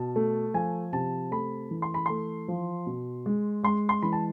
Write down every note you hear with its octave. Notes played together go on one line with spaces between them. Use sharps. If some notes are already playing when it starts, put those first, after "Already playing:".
Already playing: B2 A5
A3
F3 G#5
C3 A5
A3 B5
E3
C6
B5
A3 C6
F3
B2
G#3
G#3 C6
C6
E3 B5
A5